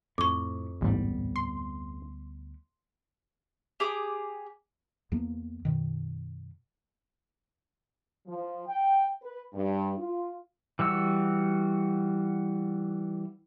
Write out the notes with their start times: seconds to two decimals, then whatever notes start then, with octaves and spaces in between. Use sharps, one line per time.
0.18 F2 A2 C#6 D6
0.81 A1 D2 G#2 G3 B3
1.36 C6
3.80 G4 G#4 D6 D#6
5.12 E2 F3 A#3 B3
5.65 F#2 B2 D#3
8.26 F3
8.66 G5
9.22 B4
9.53 G2
9.98 F4
10.79 E3 G3 F#4 E6